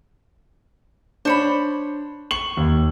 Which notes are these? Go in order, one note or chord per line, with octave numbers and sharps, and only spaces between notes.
D4 C5 C#5 B5
C#6 F#7
D#2